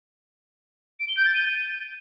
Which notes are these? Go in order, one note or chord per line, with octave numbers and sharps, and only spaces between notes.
D7
G7
G6
A6
D#7